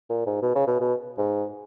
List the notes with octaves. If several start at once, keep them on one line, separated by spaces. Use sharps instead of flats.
A#2
G#2
B2
C#3
B2
B2
G#2